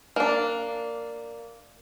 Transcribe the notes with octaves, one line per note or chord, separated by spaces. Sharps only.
A#3 D4